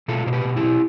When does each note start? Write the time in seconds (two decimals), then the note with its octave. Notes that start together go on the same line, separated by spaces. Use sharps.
0.08 B2 F4 A4
0.26 B2 C5
0.33 G4 B4
0.45 B2
0.56 E4 G4
0.63 B2